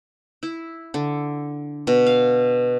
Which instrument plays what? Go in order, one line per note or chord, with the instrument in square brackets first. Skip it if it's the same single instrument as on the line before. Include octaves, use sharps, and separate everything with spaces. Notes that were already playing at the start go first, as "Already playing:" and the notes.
[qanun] E4
D3
B2
F5